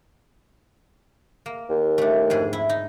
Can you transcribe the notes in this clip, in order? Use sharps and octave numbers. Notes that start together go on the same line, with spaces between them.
A#3
D#2
A3 D4
F2 G#2 G#4
E4
D#4